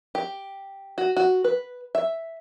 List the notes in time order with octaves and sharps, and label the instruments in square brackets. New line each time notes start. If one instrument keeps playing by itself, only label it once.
[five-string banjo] G4
F#4
F#4
B4
E5